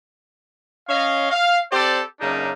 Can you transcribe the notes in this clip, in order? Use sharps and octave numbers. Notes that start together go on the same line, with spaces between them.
C#4 C#5 D#5 F5
F5
C4 G4 A4 C5 D5
F#2 C#3 A#3 D4 D#4